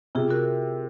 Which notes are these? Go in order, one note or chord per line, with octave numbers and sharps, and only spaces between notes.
C3 F4 G#4
F#4 A#4